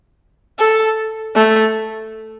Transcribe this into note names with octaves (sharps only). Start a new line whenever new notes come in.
A4
A3